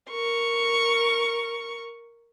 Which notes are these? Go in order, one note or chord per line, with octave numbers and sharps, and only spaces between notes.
A#4 C#6